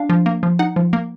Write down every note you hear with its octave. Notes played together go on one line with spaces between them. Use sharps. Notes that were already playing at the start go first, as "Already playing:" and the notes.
Already playing: D4 F5
F3
A#3
F3
D#4 F#5
F3
A#3